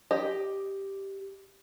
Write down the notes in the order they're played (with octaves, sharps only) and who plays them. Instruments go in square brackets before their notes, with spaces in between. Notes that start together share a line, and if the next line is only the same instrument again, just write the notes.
[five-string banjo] G4 D#5